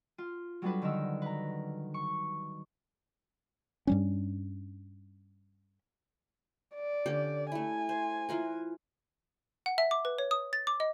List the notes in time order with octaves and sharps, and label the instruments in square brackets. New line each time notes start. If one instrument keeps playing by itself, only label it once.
[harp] F4
F#3 G3 B3 D4 A4 B4
D3 D#3 D#4 E6
B4 A#5
C#6
[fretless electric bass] G2 G3 C#4
[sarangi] D5
[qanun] D3 C#4 G4
[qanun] A3 E4 [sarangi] G#5
[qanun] C5
E3 F4 A#4
[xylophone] F#5
E5
D6
B4
C#5
D#6
A6
D6
D#5